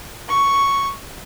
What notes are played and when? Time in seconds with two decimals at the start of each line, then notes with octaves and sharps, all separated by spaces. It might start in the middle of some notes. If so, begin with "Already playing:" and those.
0.29 C#6